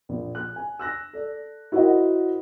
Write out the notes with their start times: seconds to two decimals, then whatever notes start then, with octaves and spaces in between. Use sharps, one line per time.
0.09 A#1
0.35 F#6
0.56 G#5
0.79 E6 F#6 A#6
1.13 A4 D5
1.72 E4 F#4 A#4 C5 D#5 F#5